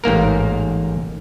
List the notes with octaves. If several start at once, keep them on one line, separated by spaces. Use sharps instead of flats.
A1 G#2 A#3 A#4